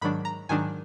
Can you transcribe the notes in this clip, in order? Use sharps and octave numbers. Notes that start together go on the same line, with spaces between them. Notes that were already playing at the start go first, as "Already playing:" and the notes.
G#2 D#3 F#3 D4 B5
A#5
G#2 D#3 F#3 D4 G#5